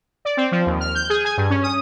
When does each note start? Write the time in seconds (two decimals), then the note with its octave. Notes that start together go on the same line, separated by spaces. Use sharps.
0.25 D5
0.37 C4
0.52 F3
0.66 D#2
0.80 F6
0.95 G6
1.10 G#4
1.25 G#5
1.37 G2
1.50 C#4
1.63 D#6